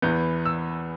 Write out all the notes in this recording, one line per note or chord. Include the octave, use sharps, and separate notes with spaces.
E2 E3 B3 G6
E6